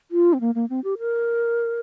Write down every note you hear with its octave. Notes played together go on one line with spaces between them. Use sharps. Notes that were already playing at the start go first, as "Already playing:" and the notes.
F4
C4
A#3
A#3
C4
G4
A#4